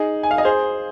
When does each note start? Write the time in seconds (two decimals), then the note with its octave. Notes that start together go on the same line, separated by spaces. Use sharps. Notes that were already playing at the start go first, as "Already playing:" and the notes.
Already playing: D#4 G#4
0.23 G#5
0.31 F5
0.38 D#5
0.45 G#4 C5